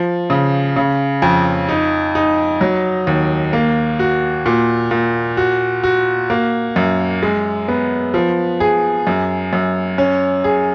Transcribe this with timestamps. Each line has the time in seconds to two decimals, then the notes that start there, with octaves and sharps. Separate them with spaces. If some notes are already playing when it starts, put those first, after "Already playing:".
Already playing: F3
0.30 C#3
0.76 C#3
1.22 F2
1.69 D#4
2.15 D#4
2.61 F#3
3.07 D#2
3.53 A#3
3.99 F#4
4.46 A#2
4.91 A#2
5.37 F#4
5.83 F#4
6.30 A#3
6.76 F#2
7.23 G#3
7.68 B3
8.14 F3
8.60 G#4
9.07 F#2
9.53 F#2
9.98 C#4
10.44 G#4